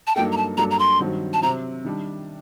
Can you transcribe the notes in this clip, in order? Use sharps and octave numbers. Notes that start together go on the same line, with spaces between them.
A5
G2 F#3 A#3 D#4 A4 G5
A#5
A5
G2 F#3 A#3 D4 A4 A#5
A#5
C6
G2 D#3 F#3 C4 F#4
A5
C3 F#3 C4 A#5
D#3 G3 D4